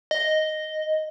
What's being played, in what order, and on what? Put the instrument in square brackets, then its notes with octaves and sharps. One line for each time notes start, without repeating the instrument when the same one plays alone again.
[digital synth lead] D#5